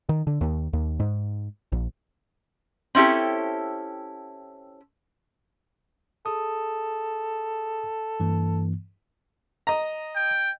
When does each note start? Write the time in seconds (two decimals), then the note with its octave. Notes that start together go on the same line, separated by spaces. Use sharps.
0.09 D#3
0.27 D3
0.41 D#2
0.73 D#2
1.00 G#2
1.72 A#1
2.95 C4 C#4 E4 G4 A4
6.26 G#4 A4 D#6
8.20 G2 E3 A#3
9.67 D#5 A#5
10.16 G5